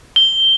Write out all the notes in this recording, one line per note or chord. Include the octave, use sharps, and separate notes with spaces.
G7